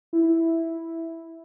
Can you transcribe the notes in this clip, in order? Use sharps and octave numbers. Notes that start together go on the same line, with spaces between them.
E4